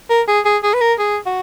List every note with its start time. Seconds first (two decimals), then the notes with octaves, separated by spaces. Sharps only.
0.10 A#4
0.28 G#4
0.45 G#4
0.63 G#4
0.74 B4
0.81 A#4
0.99 G#4
1.26 F#4